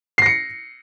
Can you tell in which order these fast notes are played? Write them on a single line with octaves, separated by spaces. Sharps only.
C7 A#6 C#7